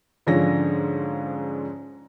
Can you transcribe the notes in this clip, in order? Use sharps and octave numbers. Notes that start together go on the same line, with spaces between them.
G#2 D3 F3 C#4 A#6